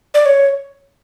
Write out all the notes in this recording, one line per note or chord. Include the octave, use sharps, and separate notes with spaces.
D5
C#5